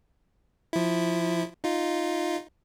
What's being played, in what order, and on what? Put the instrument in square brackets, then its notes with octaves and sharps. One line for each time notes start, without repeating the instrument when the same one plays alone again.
[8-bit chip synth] F3 E4
D#4 F4